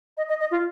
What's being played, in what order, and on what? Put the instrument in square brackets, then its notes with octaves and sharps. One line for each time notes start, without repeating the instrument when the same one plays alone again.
[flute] D#5
D#5
D#5
F4